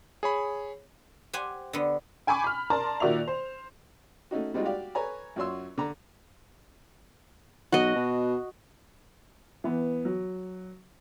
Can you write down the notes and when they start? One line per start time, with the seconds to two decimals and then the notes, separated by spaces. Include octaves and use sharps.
0.23 G#4 C#5 B5
1.33 G4 C5 F#5 G#5
1.73 D3 B3
2.27 G5 G#5 B5 C#6 D6
2.44 B5 F6
2.70 A#4 D5 A5 A#5 C6
3.00 A#2 D#3 F#4 D5 E5 F7
3.28 C5
4.31 A3 C#4 D#4 F#4
4.54 G3 G#3 C4 D#4 F4 F#4
4.65 F#4 G4 D5 F5
4.95 A4 B4 C#5 G#5 A#5
5.36 F#2 F4 F#4 C#5 C6 E6
5.78 D3 A#5
7.73 B1 F#4 D#5
7.96 B2
9.64 E3 B3
10.05 F#3